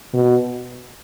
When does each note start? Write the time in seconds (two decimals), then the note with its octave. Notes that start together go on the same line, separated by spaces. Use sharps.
0.14 B2